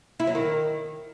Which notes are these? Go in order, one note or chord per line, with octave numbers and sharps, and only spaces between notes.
E4
F#3
D#3